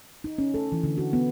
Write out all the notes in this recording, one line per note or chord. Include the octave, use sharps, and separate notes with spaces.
D#4
C#4
A4
E3
D3
F#4
B3